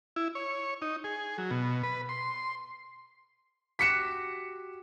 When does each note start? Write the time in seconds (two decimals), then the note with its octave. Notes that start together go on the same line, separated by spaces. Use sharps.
0.16 E4
0.35 C#5
0.82 D#4
1.04 G#4
1.38 F#3
1.51 B2
1.83 B4
2.09 C6
3.79 F#4 G4 B6 C#7 E7